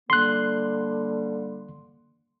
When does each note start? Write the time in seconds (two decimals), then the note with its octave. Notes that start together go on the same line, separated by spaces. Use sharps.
0.10 D3 G3 A#3 C6 F#6